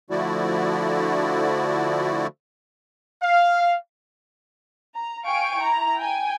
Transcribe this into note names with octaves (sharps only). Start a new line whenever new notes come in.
D3 F3 A3 E4 F#4 D5
F5
A#5
F5 G5 G#5 C#6 D7
E4 A#5
G5 G#5